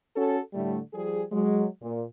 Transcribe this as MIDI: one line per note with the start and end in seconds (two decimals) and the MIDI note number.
0.16 0.39 61
0.16 0.39 66
0.16 0.39 69
0.54 0.78 45
0.54 0.78 50
0.54 0.78 55
0.54 0.78 57
0.94 1.22 53
0.94 1.22 55
0.94 1.22 68
1.32 1.66 54
1.32 1.66 56
1.82 2.03 46